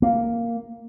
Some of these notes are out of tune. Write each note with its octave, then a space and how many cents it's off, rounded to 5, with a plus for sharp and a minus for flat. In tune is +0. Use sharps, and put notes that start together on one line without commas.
A#3 -5